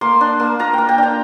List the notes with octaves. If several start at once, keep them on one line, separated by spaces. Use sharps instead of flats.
A#3 C6
D4
A#3
F4 A#5
A#3 G5
G5
D4 A#5